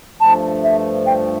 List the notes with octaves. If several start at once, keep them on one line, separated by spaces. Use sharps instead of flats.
G2 F3 A3 A5
E5
G5